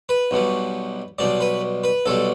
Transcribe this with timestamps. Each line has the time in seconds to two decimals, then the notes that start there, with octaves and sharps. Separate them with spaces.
0.09 B4
0.31 B1 B2 G3
1.18 B1 B2 G3 D5
1.40 B4
1.84 B4
2.06 B1 B2 G3 A4